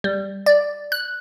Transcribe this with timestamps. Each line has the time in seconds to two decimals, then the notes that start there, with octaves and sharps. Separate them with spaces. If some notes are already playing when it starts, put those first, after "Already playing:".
0.04 G3
0.46 D5
0.92 F#6